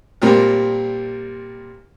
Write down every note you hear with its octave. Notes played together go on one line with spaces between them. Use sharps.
A#2 G3 C4 A#4